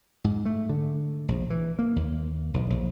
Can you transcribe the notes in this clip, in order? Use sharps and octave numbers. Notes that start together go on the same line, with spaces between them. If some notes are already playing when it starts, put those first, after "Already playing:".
G#2
A3
D3
A#1
E3
A#3
D#2
B1
A#1